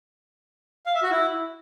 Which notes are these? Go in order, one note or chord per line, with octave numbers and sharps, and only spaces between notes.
F5
E5
F#4
E4